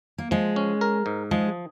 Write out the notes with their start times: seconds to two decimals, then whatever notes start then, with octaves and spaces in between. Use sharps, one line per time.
0.18 A#3
0.31 F3 G#3
0.56 C#4
0.81 A#4
1.06 G#2
1.31 F3 G#3